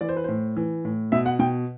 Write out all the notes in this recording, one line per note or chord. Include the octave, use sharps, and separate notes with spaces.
E3 D5
C5
B4
A2 C5
E3
A2
B2 E5
F#5
B2 G5